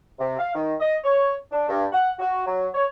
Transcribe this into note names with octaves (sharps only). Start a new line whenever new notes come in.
C3
F5
D#3
D#5
C#5
D4
G2
F#5
F#4
F#3
C#5